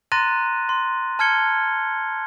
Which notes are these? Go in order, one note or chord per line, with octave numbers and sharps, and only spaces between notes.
A#5 C6 F#6 A6 A#6 D#7
C6
A5 F6 G#6 C#7 G7